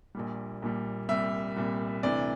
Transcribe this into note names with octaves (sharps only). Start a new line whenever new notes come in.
A#1 A#2 G3
A#1 A#2 G3
C2 A#2 G3 E5
C2 A#2 G3
D2 C3 E3 D5